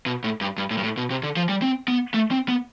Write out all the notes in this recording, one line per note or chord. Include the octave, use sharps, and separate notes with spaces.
B2
A2
G2
G2
A2
G2
A2
B2
C3
D3
F3
G3
C4
B3
A3
C4
B3